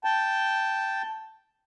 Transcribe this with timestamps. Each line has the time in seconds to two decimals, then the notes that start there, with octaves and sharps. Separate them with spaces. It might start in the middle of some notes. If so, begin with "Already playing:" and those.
0.04 G5 A5